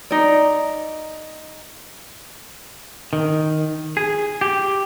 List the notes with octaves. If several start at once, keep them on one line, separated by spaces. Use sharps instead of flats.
D#4 D5
D#3
G#4
G4